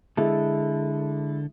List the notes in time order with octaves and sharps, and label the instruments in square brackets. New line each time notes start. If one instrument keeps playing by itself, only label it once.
[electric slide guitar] D3 A4 [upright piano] G#3 E4